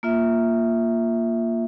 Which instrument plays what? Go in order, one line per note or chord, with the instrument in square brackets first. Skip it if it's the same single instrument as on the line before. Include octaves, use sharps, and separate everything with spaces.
[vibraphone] A#3 F4 E5